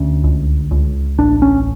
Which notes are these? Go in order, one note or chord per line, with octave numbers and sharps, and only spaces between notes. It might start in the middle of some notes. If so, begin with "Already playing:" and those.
Already playing: D2 C#4
C#2
C#2
A1 D4
C#4